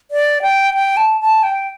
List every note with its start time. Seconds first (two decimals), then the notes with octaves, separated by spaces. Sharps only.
0.11 D5
0.42 G5
0.74 G5
0.97 A5
1.21 A5
1.43 G5